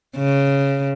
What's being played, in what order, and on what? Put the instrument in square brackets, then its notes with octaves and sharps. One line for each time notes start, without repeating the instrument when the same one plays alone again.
[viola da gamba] C#3